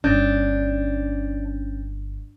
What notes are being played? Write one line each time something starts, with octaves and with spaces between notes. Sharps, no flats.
G1 C#4 D4 G6 A6